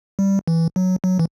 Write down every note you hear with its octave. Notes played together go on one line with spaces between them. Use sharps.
G3
E3
F#3
F#3
E3